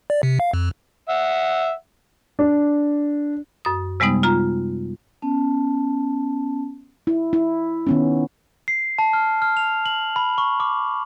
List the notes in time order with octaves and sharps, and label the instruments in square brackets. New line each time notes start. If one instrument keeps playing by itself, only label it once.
[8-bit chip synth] D5
C3
F5
F2
[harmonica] E5 F#5
[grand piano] D4
[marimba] F#2 D#6
C3 G3 G#3 B3 D#4
F4 A#5
[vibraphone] B3 C#4 A5
[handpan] E4
E4
D#3 B3 C#4
[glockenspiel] C7
A5
F6
F6
F7
F#7
B5
C#6
D6